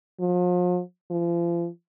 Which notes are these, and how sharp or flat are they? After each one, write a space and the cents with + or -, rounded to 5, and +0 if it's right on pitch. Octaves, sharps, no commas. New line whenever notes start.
F3 +40
F3 -35